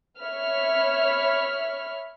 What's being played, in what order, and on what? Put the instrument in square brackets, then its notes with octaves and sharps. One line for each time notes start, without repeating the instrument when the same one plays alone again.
[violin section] C#5 E5 B5 F6